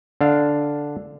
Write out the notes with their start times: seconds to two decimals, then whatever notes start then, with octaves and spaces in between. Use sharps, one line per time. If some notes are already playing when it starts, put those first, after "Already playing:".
0.21 D3 D4 F5